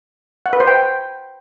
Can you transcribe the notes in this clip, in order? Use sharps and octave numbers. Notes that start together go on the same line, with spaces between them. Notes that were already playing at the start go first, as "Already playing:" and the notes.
F#5
B4
C5
G5